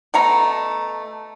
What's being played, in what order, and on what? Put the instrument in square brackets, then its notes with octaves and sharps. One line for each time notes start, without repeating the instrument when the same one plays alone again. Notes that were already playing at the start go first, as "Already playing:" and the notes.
[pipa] B2 A3 A#5